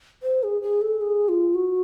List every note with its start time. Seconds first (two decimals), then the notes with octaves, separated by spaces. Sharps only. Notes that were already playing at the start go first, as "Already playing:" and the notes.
0.23 C5
0.43 G#4
0.62 G#4
0.82 A4
1.01 G#4
1.29 F4
1.54 F#4